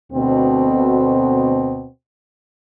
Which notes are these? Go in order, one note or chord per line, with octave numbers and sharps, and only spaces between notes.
D2 B2 C4